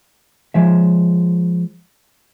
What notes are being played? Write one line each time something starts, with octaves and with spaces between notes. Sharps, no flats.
F3 G#3 E5